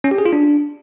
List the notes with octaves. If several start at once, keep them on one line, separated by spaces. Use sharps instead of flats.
C#4
G4
G#4
F4
D4